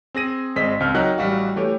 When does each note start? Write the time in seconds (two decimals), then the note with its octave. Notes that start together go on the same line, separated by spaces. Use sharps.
0.15 C4 G#4 A#6 D#7
0.56 G#1 G#3 C4 C5 D#5 B6
0.80 C#2 C4 F6
0.94 F#3 D#4 F#4 A#4 G5 F#6
1.18 A1 G3 F#4 F5
1.56 E3 A3 G4 C#5